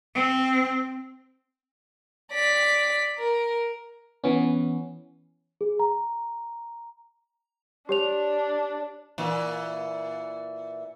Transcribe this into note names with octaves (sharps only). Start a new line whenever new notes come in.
C4
D5 B6
A#4
E3 B3 C#4
G#4
A#5
D4 G4 C#5 F7
A#2 E3